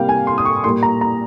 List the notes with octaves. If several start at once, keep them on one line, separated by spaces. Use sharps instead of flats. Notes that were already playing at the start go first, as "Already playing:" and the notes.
Already playing: C3 G3 A#3 F5 G5
G#5
C6
D#6
C#6
A#2 G3 A#3 C6
A#5
A#5